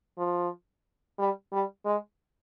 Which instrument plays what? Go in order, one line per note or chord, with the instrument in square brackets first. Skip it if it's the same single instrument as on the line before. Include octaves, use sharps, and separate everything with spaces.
[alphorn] F3
G3
G3
G#3